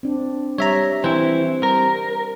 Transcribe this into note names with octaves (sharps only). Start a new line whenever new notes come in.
C4 D4
G3 C#5 E5 A#5
E3 C4 E4 C5
G3 A#4